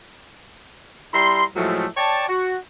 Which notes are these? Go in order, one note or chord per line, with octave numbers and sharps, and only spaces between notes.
G3 E4 A#5 C6
A2 F3 F#3 G#3 A3
C#5 D5 G5 A5
F#4